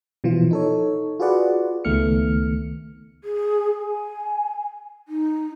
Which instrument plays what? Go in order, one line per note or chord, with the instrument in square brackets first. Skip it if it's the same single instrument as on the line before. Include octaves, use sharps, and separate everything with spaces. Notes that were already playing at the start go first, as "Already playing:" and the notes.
[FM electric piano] B2 E3 F3 F4
D#4 A4 C#5
F4 F#4 G#4 B4 D5 F#5
C#2 D#3 A3 B3 F6 C#7
[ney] G#4
G#5
D#4